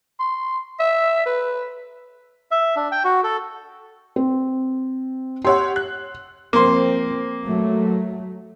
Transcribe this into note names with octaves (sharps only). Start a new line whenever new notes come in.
C6
E5
B4
E5
D4
G5
F#4
A4
C4
G4 C#5 F#5 C6 E6
F#6
F3 A#3 C4 C6
F#3 A3